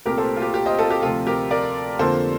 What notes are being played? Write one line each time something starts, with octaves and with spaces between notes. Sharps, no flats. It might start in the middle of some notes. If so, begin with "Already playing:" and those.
C2 A#2 A3 G4 A#4
A4 C5
F4
G4
G4
C5 D#5
F4 A4
G4
D2 C3 F3 F4 A4
G4 A#4
A#4 D5
F2 D3 F3 A#3 A4 C5